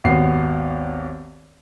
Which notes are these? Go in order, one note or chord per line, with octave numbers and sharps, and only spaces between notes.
G#1 D#2 B3 F#4 C7